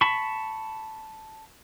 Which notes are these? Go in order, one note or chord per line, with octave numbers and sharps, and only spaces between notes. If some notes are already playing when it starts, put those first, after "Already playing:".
A5 B5 C#6